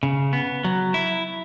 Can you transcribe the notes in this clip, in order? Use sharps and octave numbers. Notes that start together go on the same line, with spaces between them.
C#3
B3
F#3
E4